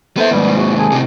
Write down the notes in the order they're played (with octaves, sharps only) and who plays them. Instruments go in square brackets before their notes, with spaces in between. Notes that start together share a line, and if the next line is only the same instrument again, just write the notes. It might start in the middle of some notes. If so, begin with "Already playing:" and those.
[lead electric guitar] B3 E5 [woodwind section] A4 C5
[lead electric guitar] D#2 G#2 [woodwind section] B2 G3
[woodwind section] E2 F#4
G#4 A4 G#5
[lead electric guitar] A2 C3